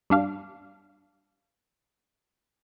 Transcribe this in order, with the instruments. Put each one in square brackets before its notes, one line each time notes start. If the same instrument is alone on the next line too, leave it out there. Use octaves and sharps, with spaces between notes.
[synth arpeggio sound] G2 D4 F5